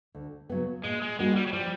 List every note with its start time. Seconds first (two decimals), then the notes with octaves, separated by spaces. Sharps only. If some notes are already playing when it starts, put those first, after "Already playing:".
0.15 D2
0.49 C#3 F#3 B3
0.84 A#2 G#3
1.02 G#3
1.19 G3 G#3 A#3 D4 F#4
1.36 G3
1.47 F#3
1.53 F3 G3